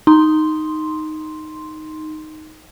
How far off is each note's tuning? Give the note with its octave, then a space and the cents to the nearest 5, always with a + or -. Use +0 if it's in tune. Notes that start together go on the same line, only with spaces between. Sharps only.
D#4 +0 C6 +0